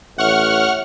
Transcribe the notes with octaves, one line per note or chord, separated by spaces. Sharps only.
A1 C#5 E5 F#5 C#6 F6